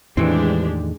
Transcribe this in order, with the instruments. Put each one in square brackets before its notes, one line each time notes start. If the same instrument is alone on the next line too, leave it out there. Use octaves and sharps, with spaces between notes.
[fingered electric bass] E2 A2 D#3 [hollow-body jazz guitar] E3 C4 [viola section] G#3 D4 G4